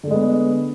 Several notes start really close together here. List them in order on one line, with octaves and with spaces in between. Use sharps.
D3 A3 G#3 B3